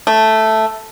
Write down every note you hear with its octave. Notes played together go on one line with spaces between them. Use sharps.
A3